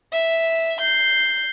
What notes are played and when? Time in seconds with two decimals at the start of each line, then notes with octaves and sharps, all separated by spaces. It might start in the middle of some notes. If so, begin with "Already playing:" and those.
0.13 E5
0.81 G6 C7